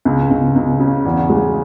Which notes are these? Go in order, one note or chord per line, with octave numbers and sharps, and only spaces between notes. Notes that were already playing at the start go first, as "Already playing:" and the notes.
C#2
C#2
C#2
C#3
E2
G#3